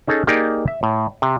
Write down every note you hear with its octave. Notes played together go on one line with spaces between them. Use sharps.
C#4 D#4 G#4 A4
A#3 D#4 G4 G#4 A#4 D5
E5
A2
C3